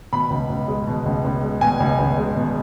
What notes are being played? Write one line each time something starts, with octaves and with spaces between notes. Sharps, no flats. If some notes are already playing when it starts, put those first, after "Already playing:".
B2 B5
C#2
C#2
G#3
B2
C#2
C#2
G#3
B2 G#5
C#2
C#2
G#3
B2